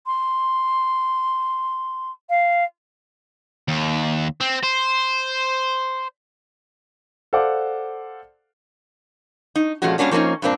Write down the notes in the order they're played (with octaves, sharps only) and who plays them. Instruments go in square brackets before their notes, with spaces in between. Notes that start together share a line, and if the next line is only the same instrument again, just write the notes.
[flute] C6
F5
[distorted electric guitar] D#2
C4
C5
[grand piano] A4 C5 D5 F5 F#5 D6
[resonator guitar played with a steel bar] D#4
A#2 F3 G#3 A3 C#4 F#4
G3 A#3 C#4 D4 F#4
F3 A#3 C4 C#4 D#4
G2 A#2 A#3 C4 D4